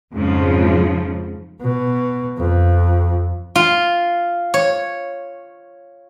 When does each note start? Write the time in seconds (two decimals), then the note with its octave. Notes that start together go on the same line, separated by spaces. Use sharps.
0.14 F2 G#2 C#3 F3
1.61 B2
2.38 F2
3.55 F4
4.54 C#5